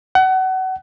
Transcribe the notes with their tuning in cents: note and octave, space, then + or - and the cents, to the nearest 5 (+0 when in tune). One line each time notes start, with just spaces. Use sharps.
F#5 +30